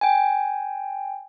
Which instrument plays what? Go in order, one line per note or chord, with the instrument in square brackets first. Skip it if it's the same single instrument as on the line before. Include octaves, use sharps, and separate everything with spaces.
[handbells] G5 G#5